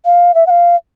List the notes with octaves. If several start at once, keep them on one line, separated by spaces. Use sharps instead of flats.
F5
E5
F#5
F5